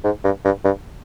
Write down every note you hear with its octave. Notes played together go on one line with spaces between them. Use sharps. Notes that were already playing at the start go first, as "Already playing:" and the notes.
G#2
G2
G2
G2